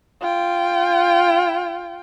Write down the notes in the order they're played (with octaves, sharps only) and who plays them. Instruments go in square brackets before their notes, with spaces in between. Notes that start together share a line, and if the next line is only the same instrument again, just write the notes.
[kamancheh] F4 G5